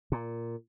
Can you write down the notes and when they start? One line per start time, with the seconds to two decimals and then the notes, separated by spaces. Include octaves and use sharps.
0.12 A#2